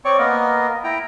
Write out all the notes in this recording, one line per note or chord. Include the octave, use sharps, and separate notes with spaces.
C4 C#5 D5 C#6
A#3 B3 A#4 D#5
E4 G5 A#5